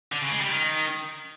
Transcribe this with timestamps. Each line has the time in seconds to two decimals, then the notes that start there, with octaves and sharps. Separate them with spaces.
0.12 D3
0.22 C#3
0.31 G#3
0.41 G3
0.50 D#3